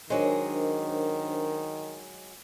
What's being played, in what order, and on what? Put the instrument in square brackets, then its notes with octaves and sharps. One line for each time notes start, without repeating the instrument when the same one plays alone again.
[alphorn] D#3 [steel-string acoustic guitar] F#3 G#3 [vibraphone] D4 A#4 C5